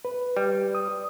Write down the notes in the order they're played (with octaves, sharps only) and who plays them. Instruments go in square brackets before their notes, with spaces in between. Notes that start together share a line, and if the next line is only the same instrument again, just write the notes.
[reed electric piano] B4
[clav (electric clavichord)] G3
[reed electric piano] D#6